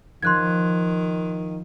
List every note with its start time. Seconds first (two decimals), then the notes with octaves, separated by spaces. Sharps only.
0.22 D#3 F3 C6 F#6 G#6